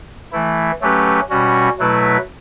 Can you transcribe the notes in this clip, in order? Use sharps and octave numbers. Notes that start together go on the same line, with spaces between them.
E3 A3 E4
F#3 A3 C#4 G4 B4
B2 G3 C#4 F#4
B2 F#3 A3 E4 B4